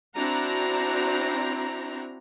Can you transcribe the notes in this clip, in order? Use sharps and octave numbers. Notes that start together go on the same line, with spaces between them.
C4 D4 E4 F#4 A#5